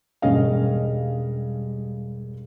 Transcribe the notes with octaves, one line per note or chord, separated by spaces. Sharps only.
E1 G2 C#4 D#5 F5